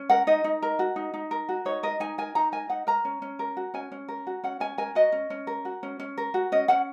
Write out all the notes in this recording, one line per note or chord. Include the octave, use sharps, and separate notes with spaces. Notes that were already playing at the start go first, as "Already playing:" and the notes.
Already playing: C#4
A#4 F#5
D#4 D#5
D#4
A#4
F#4
D#4
D#4
A#4
F#4
D#4 C#5
A#4 D#5
D#4 G#5
A#4 G#5
D#4 A#5
A#4 G#5
D#4 F#5
A#4 A#5
C#4
C#4
A#4
F#4
C#4 G#5
C#4
A#4
F#4
C#4 F#5
C#4 G#5
A#4 G#5
F#4 D#5
C#4
C#4
A#4
F#4
C#4
C#4
A#4
F#4
C#4 D#5
C#4 F#5